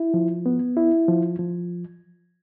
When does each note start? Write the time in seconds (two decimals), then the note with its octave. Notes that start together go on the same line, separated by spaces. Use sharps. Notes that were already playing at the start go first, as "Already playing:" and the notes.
Already playing: E4
0.14 F3
0.46 B3
0.77 E4
1.08 F3
1.39 F3